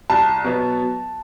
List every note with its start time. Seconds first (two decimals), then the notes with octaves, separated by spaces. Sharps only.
0.10 C2 A5
0.44 B2 F#3 B3